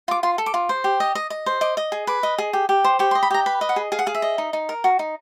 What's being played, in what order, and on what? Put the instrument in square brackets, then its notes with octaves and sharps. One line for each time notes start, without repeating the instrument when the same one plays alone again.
[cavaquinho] F4 D6
F4 C6
A4
D6
F4
C5
G4
D#5
D#5
D#5
C5
D#5 D6
D#5
G#4
B4 D6
D#5
G#4
G4
G4
C5
G4 C#6
C6
D#5
B5
G4 A#5
B4 B5
D#5
F#5
G#4
G#4 F5
F#5
G#4 F5
E5
D#5
D#4
D#4
A#4
F#4
D#4